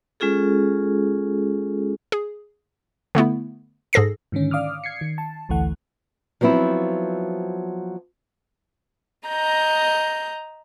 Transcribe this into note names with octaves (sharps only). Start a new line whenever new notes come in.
G#3 C#4 F4 G#4 A4
G#4
D3 A3 B3 E4
G#2 G#4 A4 A#6 C7
G#2 D3 D#3 C#4
D5 F5 D6 D#6 F6
G#6 C7 C#7
D#3
A5
A1 D2 E3 A3 F#5
F3 F#3 B3 C4 E4
D#5 A#5 G6